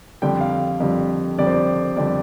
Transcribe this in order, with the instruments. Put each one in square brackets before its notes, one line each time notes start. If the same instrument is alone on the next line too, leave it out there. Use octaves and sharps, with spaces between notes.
[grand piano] F2 D3 G3 G5
F5
F2 D3 G3
F2 D3 G3 D5
C5
D5
F2 D3 G3 D5